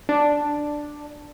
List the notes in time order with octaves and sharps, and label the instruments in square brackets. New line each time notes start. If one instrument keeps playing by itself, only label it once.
[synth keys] D4